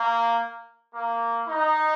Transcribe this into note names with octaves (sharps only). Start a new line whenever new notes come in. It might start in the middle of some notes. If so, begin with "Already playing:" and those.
Already playing: A#3
A#3
D#4